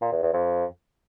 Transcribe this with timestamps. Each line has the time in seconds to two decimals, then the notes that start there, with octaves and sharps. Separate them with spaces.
0.01 A#2
0.12 E2
0.23 E2
0.34 F2